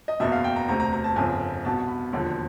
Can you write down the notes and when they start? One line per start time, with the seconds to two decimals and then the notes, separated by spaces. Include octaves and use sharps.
0.08 D#5
0.20 F#1 E2 B2 E5
0.32 F5
0.44 G5
0.56 A#5
0.68 E1 D2 C3 A#5
0.80 A#5
0.93 A#5
1.04 A5
1.16 G1 F2 C#3 G#5
1.64 C2 B2 A5
1.88 B5
2.13 E1 D#2 D3 F3